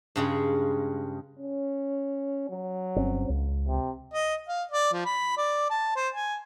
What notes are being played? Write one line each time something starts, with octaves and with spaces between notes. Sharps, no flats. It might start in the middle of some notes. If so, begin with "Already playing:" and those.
G2 C#3 G#3
C#4
F#3
G1 C4 C#4
C#2
C3
D#5
F5
D5
F3
B5
D5
A5
C5
G#5